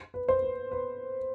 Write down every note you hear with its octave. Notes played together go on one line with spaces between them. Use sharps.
B4
C5
B4
B4